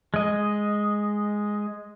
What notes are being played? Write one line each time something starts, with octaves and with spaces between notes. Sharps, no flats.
G#3 D#5